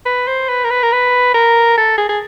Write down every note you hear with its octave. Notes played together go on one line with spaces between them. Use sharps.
B4
C5
B4
A#4
B4
A#4
B4
A#4
A4
G#4
G#4